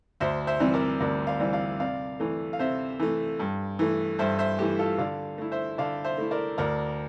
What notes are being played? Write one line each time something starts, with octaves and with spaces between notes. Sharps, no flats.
D2 C5 E5
C5 E5
C3 E3 G3 C4
A#4 D5
D2 A#4 D5
D5 F5
C3 E3 G3 C4
D5 F5
C3 D5 F5
E3 A3
F5
C3 C5 E5
E3 A3
G2
E3 A3
G2 C5 E5
C5 E5
E3 A3 G4
F4 A4
D3 D5 F5
A3 E4
C5 E5
D3 D5 F5
C5 E5
A3 E4
A#4 D5
D2 A#4 D5